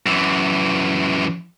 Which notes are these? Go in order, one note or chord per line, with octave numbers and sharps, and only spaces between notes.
F#2 E3